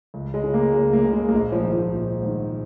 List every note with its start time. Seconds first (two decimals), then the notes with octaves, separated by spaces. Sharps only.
0.14 C#2
0.34 G#3
0.44 C#3
0.54 A#3
0.74 C#2 G#3
0.93 A#3
1.03 C#3 A#3
1.13 G#3
1.29 A#3
1.33 A#1 G#3
1.52 F3
1.63 G#2 D#3
1.72 F3
1.92 A#1
2.22 G#2 D#3